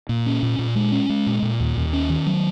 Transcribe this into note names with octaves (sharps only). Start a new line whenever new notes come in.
A#2
C#4
A#2
A#2
G#3
C#4
G#3
A#2
A#2
D#2
D#2
C#4
D#3
F#3